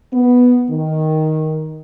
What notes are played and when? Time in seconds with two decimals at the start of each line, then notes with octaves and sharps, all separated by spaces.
0.13 B3
0.70 D#3